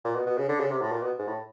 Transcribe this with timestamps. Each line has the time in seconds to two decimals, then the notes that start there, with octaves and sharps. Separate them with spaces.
0.05 A#2
0.16 B2
0.26 B2
0.38 C#3
0.49 D3
0.60 C#3
0.71 C3
0.81 A2
0.92 A#2
1.03 B2
1.19 G#2
1.27 A2